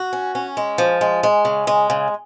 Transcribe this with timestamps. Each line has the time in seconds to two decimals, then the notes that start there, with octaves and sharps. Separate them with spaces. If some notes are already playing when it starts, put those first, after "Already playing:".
Already playing: F#4
0.13 C#4
0.35 C#4
0.57 G#3
0.78 F3
1.01 G#3
1.23 G#3
1.45 C#3
1.67 G#3
1.90 C#3